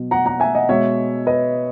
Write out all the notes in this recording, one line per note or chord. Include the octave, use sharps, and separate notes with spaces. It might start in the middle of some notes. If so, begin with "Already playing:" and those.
Already playing: B2 F#3
F#5 A#5
F#5 A#5
E5 G#5
D#5 F#5
B2 G#3 C#5 E5
B4 D#5